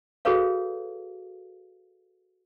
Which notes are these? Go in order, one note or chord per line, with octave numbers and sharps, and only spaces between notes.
F#4 G#4 A4 B4 C#5 F5